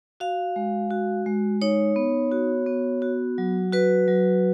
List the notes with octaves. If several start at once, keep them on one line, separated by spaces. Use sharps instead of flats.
F#4 F5
G#3
F#4
G#3
D#4 C#5
B3
F#4
B3
F#4
F#3
F#4 B4
F#3